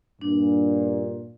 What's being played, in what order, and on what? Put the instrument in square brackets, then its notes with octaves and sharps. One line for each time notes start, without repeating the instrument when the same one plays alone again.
[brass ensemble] G2 A#2 [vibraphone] D4